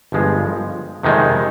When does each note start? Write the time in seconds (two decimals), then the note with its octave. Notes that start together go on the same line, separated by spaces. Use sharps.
0.12 G1 G2 F3 G#3
1.03 F2 C3 D#3 G#3 D#4